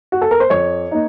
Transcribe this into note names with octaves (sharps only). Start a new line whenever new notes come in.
F#4
A4
A#4
C5
F2 C#5
A#3 D#4